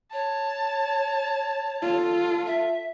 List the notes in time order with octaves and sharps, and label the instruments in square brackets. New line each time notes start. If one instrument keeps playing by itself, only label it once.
[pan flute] C#5 [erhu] A5
[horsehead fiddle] F4 A4
[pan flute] E5